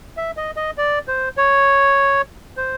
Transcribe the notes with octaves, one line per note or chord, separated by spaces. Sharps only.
E5
D#5
D#5
D5
C5
C#5
C5